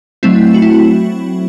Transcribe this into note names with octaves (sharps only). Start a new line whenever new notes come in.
F#3 A3 C4 E4
F#4
E4